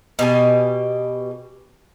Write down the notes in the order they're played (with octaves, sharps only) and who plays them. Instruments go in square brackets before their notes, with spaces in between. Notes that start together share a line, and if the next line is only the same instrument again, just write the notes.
[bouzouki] B2 G4 G#5